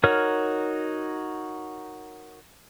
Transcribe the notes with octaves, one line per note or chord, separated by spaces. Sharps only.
D#4 F#4 A#4 C#5 F6